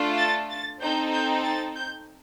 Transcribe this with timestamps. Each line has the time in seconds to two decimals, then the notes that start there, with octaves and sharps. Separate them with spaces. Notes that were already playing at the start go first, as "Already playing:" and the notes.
Already playing: A3 D4 F4 A4
0.18 A6
0.50 A6
0.81 C4 D#4 A4 G6
1.13 G6
1.44 A6
1.75 G6